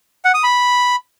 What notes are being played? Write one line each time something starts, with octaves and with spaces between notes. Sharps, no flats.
F#5
D#6
B5